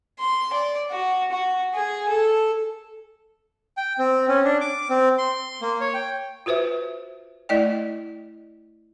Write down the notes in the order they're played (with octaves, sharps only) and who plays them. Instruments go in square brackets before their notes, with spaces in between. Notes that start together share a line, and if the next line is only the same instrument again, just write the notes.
[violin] C6
D5
F#4
F#4
G#4
A4
[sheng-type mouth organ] G5
C4
C#4
D4
D6
C4
C6
A#3
C#5
G5
[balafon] F4 F#4 B4 C5 E5
A3 E4 D5 D#5 G5